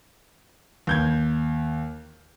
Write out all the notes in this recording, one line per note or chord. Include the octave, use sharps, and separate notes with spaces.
D#2 G6 G#6